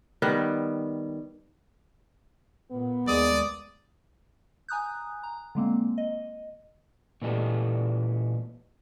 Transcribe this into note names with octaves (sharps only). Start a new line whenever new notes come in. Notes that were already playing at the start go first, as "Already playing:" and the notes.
D#3 G3 B3
A#2 B3
D#2 G#3 A#3 D5 D#6
G#5 A#5 D#6 F#6 G6
A#5
D3 G#3 A#3 C4
D#5
A#2 E3 G#3 G4 A4